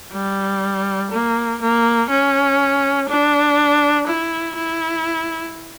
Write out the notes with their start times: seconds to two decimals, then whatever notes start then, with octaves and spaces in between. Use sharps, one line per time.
0.13 G3
1.12 A#3
1.61 A#3
2.10 C#4
3.09 D4
4.07 E4
4.56 E4